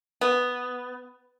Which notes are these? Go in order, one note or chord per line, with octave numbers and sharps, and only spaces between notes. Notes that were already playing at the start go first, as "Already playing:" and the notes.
B3